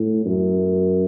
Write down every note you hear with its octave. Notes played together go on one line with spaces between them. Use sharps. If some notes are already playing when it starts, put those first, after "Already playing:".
Already playing: A2
F#2